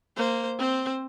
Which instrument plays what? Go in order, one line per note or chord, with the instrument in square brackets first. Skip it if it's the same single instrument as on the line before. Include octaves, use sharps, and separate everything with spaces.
[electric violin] A#3 [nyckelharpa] C5
[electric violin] C4 [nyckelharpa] C5